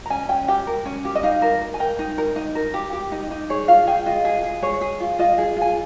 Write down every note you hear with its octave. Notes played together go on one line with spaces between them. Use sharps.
A#5
C#4 G#5
C#4 G5
G4 G5
A#4
C#4
G4
D#5
D#4 F5
A#4
A#4
G#5
A#4 G5
D#4
A#4
D#4
A#4
G4
G4
D#4
D#4
G#4 C#5
F4 F5
G#4 G5
F4 D#5
G#4
G#4
G#4 C#5
G#4
F4
F4 D#5
G#4
F4
G#5